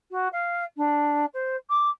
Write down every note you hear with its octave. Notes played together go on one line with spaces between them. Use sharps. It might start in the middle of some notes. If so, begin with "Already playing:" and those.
F#4
F5
D4
C5
D6